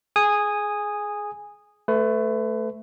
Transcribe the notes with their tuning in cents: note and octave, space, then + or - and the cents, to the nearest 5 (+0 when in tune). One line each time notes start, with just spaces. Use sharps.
G#4 +15 G#5 -10 D#6 -5
A3 +0 B4 +30